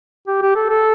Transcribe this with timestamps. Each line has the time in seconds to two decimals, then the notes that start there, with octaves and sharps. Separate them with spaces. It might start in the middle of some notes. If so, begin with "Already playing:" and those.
0.27 G4
0.42 G4
0.56 A4
0.69 A4